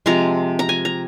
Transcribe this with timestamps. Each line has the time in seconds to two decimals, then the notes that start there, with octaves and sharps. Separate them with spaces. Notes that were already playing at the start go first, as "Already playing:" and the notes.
0.06 C3 F3 G#3 A#5
0.59 A#5
0.69 G#5
0.85 A#5